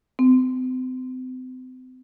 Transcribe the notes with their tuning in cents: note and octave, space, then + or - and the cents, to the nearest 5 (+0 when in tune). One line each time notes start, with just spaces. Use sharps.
C4 -40